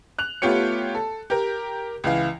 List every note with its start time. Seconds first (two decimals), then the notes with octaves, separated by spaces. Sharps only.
0.19 F#6 F7
0.42 A3 B3 F4 G4 C#5 C#7
0.95 A4
1.30 G4 A#4
2.04 C#2 E3 F5